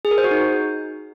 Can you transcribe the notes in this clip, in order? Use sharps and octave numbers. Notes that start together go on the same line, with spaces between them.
G#4
A#4
C5
F#4
D#4